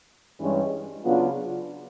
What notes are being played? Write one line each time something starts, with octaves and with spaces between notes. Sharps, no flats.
G2 E3 G#3 C#4
C#3 F#3 B3 D4 F4